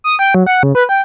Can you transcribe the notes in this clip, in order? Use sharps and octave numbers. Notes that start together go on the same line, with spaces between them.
D#6
G5
F#3
F#5
C#3
B4
G5